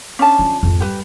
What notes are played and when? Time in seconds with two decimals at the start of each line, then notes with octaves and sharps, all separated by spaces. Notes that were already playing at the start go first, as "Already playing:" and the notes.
0.19 C#4 D4 A5
0.39 D3 F3
0.63 F2 G#2
0.80 G3 G4 B4